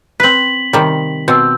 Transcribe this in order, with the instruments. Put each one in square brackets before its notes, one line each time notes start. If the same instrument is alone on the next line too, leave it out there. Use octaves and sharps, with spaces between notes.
[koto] C4 B4 [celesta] B6 F#7
[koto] C3 D#3 G3
[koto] B2 C4 [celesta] E6 G6